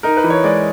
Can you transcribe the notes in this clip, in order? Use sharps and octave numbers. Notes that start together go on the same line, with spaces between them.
D#4 A#4
B4
E3
C#5
G#3 D5